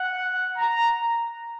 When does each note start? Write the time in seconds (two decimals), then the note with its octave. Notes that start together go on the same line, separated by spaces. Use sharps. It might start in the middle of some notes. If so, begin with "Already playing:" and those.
Already playing: F#5
0.58 A#5